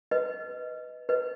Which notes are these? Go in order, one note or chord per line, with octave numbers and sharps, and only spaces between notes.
B4 D#5
B4 D#5